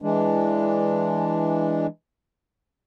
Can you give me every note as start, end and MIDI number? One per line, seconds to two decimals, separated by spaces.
0.02 1.87 52
0.02 1.87 56
0.02 1.87 62